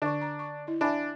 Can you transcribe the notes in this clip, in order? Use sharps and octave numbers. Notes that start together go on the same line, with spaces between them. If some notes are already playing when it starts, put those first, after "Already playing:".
D3 D4 C#6
A#5
C#6
E4 D#5
D4 E5 G#5 B5